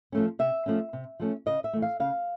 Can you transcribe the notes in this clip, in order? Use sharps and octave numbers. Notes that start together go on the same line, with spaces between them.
F3 A3 C#4
C3 E5
F3 A3 C#4
C3
F3 A3 C#4
C#3 D#5
E5
E3 A3
F5
C#3 F5